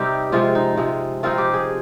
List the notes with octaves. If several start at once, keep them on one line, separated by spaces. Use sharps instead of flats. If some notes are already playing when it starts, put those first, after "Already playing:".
Already playing: C3 G3 C4 D#4 G4
C3 F3 G#3 F4
D#4
C3 F3 G#3
F3 C4 D#4 F4
G4
G#4